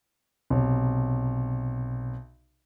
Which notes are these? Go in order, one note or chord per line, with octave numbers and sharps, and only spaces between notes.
B1 C3